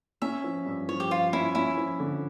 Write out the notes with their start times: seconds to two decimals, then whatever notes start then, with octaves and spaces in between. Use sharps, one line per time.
0.22 C#4 E5
0.44 F3
0.66 G2
0.89 F3 C#5
1.00 G4
1.10 F3 F4
1.33 C#4 E4
1.55 C#4 E4
1.77 F3
2.00 D3